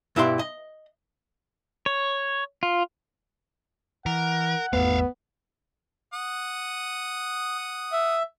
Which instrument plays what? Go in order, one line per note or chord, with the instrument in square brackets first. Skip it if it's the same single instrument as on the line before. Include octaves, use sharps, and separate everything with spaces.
[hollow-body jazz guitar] G2 B2 E4 G4 D5 C6
D#5
[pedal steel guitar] C#5
F4
[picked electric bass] E3 [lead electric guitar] A#4 [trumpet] F#5
[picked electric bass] G#1 E2 A3 [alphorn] B3 [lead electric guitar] E5 F5
[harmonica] F#5 D#6
[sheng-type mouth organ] E5